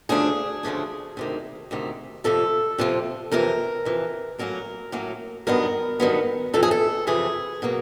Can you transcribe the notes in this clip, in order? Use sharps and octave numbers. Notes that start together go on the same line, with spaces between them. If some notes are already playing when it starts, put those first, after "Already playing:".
D2 C#3 F3 A3 D4 G#4
D2 C#3 F3 A3 D4
D2 C3 D#3
D2 C3 D#3
F2 C3 F3 A4
F2 C3 F3
F2 C3 E3 A#4
F2 C3 E3
A2 F#3 A#3 C#4 A#4
A2 F#3 A#3 C#4
G2 D#3 F#3 B3 A#4
G2 D#3 F#3 B3
F2 C3 E3 A4
G#4
A4
F2 C3 E3 G#4
B2 F#3 A#3